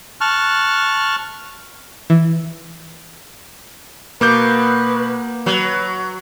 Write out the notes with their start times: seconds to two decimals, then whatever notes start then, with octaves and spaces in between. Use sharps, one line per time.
0.21 A5 C#6 F6 F#6
2.10 E3
4.21 B2 A#3 B4 D6 G6
5.46 F#3 B4